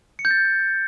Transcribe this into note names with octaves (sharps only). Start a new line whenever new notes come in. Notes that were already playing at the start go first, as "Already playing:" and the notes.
C#7
G6
A6